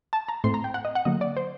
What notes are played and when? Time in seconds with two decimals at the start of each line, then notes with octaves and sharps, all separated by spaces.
0.13 A5
0.29 A#5
0.44 A2 A3 C4 C6
0.54 A#5
0.64 G5
0.74 F#5
0.85 D#5
0.95 F#5
1.05 D3 F#3 A#3 D#5
1.21 D5
1.37 C5